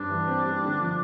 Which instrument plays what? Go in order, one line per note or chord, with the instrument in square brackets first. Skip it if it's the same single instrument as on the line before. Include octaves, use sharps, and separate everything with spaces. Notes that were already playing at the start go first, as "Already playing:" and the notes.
Already playing: [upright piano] G2 G3 C4 [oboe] D4
[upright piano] E3
C4
G3
D3
F3